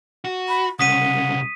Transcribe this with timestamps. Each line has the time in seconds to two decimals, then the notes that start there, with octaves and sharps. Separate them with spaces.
0.24 F#4
0.48 B5
0.79 C2 C#3 F#5 D#6 B6 D#7